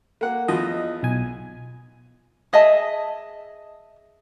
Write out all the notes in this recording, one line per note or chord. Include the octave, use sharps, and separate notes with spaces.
A#3 F#5
E2 F3 D#5
B1 G#5
G#4 D#5 E5 A5